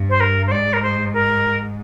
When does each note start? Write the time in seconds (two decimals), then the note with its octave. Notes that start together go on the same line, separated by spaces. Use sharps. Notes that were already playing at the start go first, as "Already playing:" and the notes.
Already playing: G2
0.09 C5
0.20 A#4
0.47 C5
0.51 G#2 D5
0.73 A#4
0.82 C5
1.13 A#4